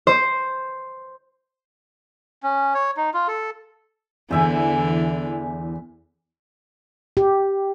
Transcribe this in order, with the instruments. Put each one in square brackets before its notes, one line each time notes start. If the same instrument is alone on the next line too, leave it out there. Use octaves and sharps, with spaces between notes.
[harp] C5
[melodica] C#4
C#5
D#4
F4
A4
[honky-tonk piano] E2 [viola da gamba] D3 E3 [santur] C5 E5 G#5
[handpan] G4